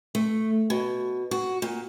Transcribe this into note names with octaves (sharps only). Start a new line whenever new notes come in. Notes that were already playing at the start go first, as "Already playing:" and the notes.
A3
B2
F#4
A#2